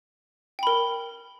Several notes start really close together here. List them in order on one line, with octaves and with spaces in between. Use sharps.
G5 B5 A#4